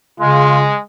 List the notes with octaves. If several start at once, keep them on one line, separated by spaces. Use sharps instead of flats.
C#3 G#3 F4